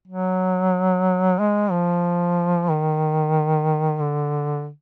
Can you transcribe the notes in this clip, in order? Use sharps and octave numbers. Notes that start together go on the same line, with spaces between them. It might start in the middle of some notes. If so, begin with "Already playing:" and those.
F#3
G#3
F3
D#3
D3